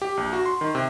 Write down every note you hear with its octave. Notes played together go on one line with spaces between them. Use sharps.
G4
A#1
F#4
C6
D#3
C3